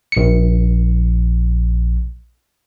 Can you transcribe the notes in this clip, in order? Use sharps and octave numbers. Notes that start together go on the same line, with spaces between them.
A#1 C#7